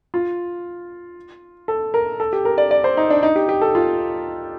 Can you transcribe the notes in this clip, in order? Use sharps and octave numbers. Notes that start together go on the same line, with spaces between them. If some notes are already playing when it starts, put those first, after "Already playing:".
F4
A4
A#4
A4
G4
A#4
D5
D5
C5
D#4
D4
D#4
G4
G4
A4
F4